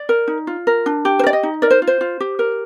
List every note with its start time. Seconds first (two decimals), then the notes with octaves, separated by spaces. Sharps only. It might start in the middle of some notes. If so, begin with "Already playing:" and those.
Already playing: D5
0.09 A#4
0.28 D#4
0.47 F4
0.67 A#4
0.86 D4
1.05 G4
1.19 C5
1.23 A#4
1.27 D5
1.33 D#5
1.43 D#4
1.62 A#4 D5
1.71 C5
1.82 F4
1.87 C5
2.01 F4
2.20 G4
2.39 A#4